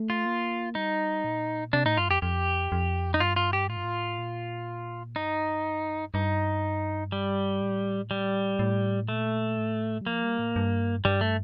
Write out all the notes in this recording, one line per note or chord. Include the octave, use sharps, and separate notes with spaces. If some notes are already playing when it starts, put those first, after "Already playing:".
Already playing: A3
F4
A#3
G3 D#4
A#2
C3 D4
A2 D#4
G2 F4
F2 G4
F2 G4
F2
D#4
G2 F4
F4
G4
A2 F4
G2
A2
A#2
G2 D#4
G2 D#4
G3
A2
G3
A2
A#2 A3
A2
G3
F3 A#3
G3
A2
G2
G2 G3
A3